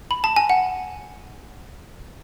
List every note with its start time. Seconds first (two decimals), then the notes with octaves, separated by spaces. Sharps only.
0.11 B5
0.24 A5
0.36 G#5
0.50 F#5